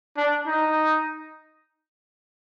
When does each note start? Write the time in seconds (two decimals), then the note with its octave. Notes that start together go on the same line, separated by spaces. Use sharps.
0.17 D4
0.47 D#4